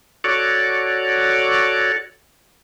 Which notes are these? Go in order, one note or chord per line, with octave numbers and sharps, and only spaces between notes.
F#4 A4 C#5 D5